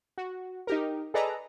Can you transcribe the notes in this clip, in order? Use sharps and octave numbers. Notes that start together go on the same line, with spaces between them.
F#4
D#4 G4 A#4
G#4 A4 B4 D5 D#5 A#5